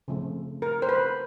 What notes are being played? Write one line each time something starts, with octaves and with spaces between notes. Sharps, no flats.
C#3 F3 A3 C4
A#4
C5
B4